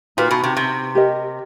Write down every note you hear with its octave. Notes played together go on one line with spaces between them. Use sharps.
A#2 D#4 F#4 B4
B2
C3
C3
G4 A#4 D#5